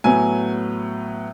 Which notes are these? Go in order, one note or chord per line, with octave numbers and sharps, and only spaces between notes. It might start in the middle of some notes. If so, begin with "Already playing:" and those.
A2 F#3 B3 G#5